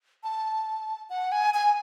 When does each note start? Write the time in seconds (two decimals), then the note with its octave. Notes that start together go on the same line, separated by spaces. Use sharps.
0.24 A5
1.10 F#5
1.32 G#5
1.54 G#5